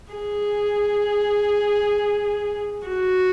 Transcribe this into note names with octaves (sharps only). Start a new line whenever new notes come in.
G#4
F#4